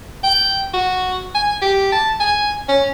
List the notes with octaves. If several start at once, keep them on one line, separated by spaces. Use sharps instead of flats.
G5
F#4
G#5
G4
A5
G#5
C#4